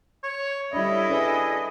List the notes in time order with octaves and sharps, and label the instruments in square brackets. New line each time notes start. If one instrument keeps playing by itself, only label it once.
[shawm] C#5
[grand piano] G3 D4 [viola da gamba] E4 A4 [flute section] C#5 E5 B5 [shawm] D#5
[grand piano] D4 B4 [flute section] G#4